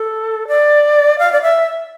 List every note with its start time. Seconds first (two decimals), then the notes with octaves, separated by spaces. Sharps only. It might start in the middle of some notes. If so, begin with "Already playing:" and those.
Already playing: A4
0.48 D5
1.19 F5
1.32 D5
1.42 E5